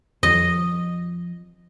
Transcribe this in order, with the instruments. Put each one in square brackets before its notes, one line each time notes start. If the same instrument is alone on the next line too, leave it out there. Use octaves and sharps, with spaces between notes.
[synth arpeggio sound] F2 [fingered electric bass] F3 [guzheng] D#5